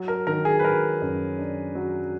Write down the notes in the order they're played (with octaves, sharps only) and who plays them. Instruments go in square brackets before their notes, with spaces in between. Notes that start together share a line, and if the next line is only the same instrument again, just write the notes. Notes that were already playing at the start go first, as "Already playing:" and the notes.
Already playing: [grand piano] F#3
A#4
D#3 A#4
G#4
B4
F#3 A#4
F#2
D4
F#3